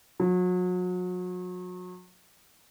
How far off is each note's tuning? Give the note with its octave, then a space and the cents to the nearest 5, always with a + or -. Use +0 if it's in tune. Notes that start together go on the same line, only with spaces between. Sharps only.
F#3 -35